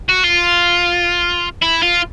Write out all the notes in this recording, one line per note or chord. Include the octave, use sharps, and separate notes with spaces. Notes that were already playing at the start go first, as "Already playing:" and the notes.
F#4
F4
E4
F4